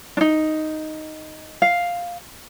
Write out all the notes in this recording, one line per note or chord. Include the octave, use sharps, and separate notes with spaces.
D4 D#4
F5